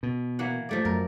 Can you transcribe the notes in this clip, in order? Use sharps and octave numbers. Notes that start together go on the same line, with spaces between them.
B2
E3 A#3 F#5
F3 A3 D5
F#2 A#4